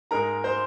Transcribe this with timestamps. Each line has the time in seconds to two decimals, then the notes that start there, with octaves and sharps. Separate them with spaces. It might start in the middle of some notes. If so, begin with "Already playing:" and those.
0.11 G#2 G#3 D#4 A#4 A#5
0.44 C5 C6